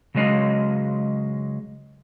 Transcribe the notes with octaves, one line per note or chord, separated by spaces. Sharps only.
C#3 F#3 G#3 D#5 F5